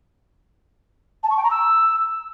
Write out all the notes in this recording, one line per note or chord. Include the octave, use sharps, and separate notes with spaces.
A5
C#6
G5
A#5
E6